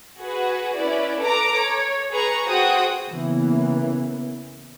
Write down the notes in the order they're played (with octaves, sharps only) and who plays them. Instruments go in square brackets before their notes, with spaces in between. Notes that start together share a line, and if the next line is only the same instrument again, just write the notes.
[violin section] F#4 G#4 B4
C#4 E4 B4 D5
A4 B4 A#5 D6
C#5
G#4 B4 A#5 C#6
F#4 G#4 C5 F#5 G5 D#6
[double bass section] C#3 E3 A#3 B3